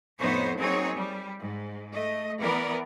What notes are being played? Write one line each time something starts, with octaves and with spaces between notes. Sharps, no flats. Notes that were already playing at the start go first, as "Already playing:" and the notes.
F2 A2 B3 D#4 C5 C#5
F#3 A#3 C4 D#4 G#4 C#5
G3
G#2
A3 D#5
E3 B3 A#4 D5